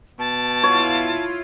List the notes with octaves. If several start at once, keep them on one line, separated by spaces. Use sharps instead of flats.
B2 A5
E4 F4 C#5